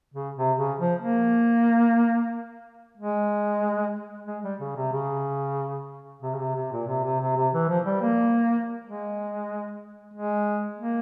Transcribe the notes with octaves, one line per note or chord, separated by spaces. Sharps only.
C#3
C3
C#3
F3
A#3
G#3
G#3
G3
C#3
C3
C#3
C3
C#3
C3
C3
A#2
C3
C3
C3
C3
E3
F3
G3
A#3
G#3
G#3
A#3